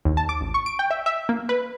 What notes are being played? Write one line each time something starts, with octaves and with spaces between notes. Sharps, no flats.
D#2
A5
D6
A1
C#6
D7
G5
E5
E5
A#3
B4